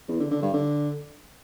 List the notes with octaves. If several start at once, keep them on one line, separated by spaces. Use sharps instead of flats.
E2
D3
D3
G2
D3